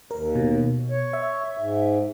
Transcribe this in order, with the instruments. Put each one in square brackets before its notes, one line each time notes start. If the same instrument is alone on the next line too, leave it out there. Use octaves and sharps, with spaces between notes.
[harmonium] D#2 [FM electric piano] A#4
[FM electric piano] B2
[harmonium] C#5
[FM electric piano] E5
[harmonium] G#2